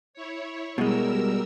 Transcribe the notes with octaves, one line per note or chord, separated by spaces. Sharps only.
E4 C#5
B2 G3 G#3 A#4 E6